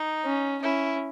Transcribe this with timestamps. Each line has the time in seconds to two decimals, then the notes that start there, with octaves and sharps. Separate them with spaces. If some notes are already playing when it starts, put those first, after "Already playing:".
Already playing: D#4
0.25 C#4
0.63 C#4 E4